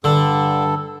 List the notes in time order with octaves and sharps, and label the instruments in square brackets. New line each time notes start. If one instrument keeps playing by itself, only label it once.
[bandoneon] G2 A4 [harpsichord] D3